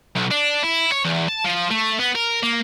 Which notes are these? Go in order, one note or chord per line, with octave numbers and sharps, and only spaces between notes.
B1
D4
E4
C#5
E2
A5
F3
A3
B3
A#4
A#3